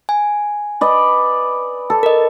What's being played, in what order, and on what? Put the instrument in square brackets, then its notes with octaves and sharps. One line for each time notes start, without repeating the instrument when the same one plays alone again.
[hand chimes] G#5
[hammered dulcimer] B4 D5 D#5
A4
[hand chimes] A#4 D#5